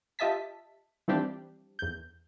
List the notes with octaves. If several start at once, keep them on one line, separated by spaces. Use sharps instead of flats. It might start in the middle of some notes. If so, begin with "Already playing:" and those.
F4 G4 D#5 E5 A5 B6
E3 F3 G3 C4 D4 G4
E2 G6